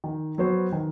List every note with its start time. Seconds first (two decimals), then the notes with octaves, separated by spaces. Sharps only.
0.04 D#3
0.38 F#3 B3 F#4 C5
0.72 D#3